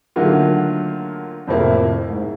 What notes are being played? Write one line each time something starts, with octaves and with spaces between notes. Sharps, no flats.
D3 D#3 F#3 A3 A#3 F4
F2 A2 C3 F3 A#3 E4
G#2